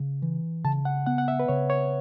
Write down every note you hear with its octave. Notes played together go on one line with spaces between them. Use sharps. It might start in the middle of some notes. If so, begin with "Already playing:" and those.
Already playing: C#3
E3
C#3 A5
F#5
B3 F#5
F#5
E5
B4
C#3 C#5
C#5